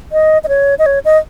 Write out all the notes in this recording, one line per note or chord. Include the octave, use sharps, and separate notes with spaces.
D#5
D#5
C#5
D#5
C#5
D#5